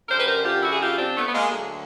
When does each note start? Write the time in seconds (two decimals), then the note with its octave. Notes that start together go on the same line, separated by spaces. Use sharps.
0.08 F#2 D3 G3 A#4 C5
0.19 B4
0.27 A#4 C5
0.44 F4 G4
0.62 E4 F#4
0.71 G#4
0.79 F4 G4
0.97 C4 D4
1.16 A3 B3
1.27 B3
1.33 G#3 A#3
1.51 D2 D3 F#3